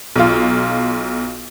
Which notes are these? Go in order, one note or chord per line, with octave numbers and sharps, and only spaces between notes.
B1 F4